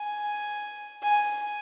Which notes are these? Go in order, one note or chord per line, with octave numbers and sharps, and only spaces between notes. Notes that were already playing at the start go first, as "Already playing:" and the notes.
Already playing: G#5
G#5